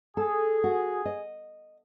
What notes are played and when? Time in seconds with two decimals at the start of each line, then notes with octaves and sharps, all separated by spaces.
0.17 G#4 A4
0.64 F#4
1.05 D#5